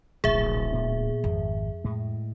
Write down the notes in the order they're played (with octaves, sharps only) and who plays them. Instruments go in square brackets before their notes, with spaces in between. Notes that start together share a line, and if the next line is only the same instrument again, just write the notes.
[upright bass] D1 E4 [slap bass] A#1 C3 [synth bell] G#4 E5
[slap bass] A#2 B3
[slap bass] G#1 [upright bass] F2
[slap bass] A2 G#3